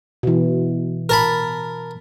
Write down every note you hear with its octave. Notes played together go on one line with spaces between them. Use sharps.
B2 E3
A#4 A5 B5